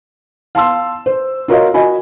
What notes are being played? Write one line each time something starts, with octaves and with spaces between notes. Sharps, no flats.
F5 A5 C6 E6
C5
F4 F#4 A#4 C#5 D#5 F5
F#4 D#5 G#5 B5